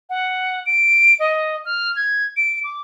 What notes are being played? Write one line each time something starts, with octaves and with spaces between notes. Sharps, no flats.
F#5
D7
D#5
F6
G#6
D7
D6